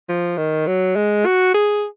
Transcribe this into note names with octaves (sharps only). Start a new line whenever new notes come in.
F3
D#3
F#3
G#3
F#4
G#4